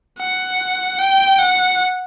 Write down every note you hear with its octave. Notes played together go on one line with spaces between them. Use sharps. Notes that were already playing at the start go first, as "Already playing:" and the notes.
F#5
G5
F#5